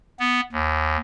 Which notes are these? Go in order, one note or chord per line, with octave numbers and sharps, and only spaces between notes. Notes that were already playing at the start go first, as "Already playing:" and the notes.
B3
D#2